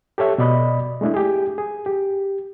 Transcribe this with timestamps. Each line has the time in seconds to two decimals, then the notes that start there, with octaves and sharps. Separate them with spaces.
0.18 G4 A4 C#5 E5
0.38 B2 D5 D#5 B5
1.01 G#3 A3 D4 E4
1.14 G4 G#4
1.58 G#4
1.86 G4